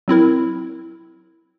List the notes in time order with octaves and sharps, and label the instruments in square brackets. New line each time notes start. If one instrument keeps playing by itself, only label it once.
[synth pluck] F#3 C4 E4 A#4